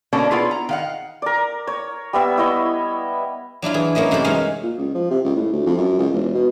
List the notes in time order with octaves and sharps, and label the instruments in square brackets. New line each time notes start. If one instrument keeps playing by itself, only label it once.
[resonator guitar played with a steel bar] B2 D3 A#3 C#4 D4
B3 E4 F4 G#4
A#5
D#3 F5 F#5
[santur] A#4 D5
C#5
G3 B3 E5 E6
E4 C#5 D#5 E5
[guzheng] F#3 D4 E4 F4
E3 G#4
F#3 A#3 C#4 E4 D#5
F#2 C3 E3 A3 C5 B5
G#3 C#4 D#4 F#4 F5
[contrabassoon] A#2
C#2
F3
C3
C#2
A2
D2
F2
F#2
C#2
E1
B2